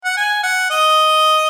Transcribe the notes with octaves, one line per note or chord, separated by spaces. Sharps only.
F#5
G#5
F#5
D#5